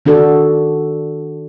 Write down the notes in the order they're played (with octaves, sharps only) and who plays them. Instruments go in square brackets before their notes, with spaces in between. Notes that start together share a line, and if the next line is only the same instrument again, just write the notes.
[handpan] D#3 D4 F#4 A4